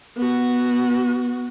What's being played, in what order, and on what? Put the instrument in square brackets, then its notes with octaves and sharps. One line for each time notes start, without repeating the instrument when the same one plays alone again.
[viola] B3 F#4